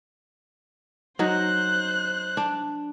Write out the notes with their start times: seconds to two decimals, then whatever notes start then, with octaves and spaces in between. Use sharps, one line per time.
1.19 F#3 D#4 C5 F#6
2.37 D4